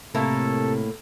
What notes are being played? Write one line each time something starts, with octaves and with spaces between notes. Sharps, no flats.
A2 C3 A#3 E4 A4